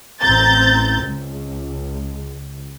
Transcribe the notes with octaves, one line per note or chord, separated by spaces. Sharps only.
A1 C4 A#5 G6 A6
C#2